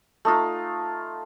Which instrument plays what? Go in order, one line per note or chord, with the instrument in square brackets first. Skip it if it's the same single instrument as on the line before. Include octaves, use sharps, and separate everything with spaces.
[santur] A3 D#4 F4